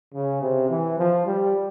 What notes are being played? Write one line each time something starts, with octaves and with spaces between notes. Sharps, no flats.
C#3
C3
E3
F3
G3